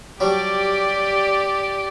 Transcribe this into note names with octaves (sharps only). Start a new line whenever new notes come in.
F#3 G3 D4 G4 D5